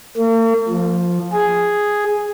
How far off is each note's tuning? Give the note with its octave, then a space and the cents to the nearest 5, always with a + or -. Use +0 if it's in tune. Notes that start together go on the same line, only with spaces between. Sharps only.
A#3 -45
F3 +5
G#4 +0